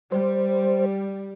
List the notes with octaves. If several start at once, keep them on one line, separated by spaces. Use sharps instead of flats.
G3 C5